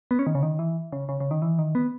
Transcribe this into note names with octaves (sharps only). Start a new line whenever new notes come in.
B3
C#4
D#3
C#3
D#3
E3
C#3
C#3
C#3
D#3
E3
D#3
B3